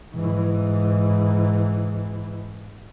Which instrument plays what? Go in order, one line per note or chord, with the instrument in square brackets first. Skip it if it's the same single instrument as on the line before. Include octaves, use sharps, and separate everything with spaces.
[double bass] G#2 E3